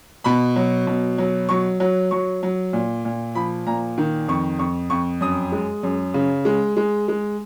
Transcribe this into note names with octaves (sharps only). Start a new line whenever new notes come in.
B2 B5
F#3
B2
F#3
F#3 C#6
F#3
F#3 C#6
F#3
A#2
A#2
F3 B5
A#2 A#5
D#3
F2 C#6
F2 C#6
F2 C#6
F#2 D#6
G#3
F#2
C#3
G#3
G#3
G#3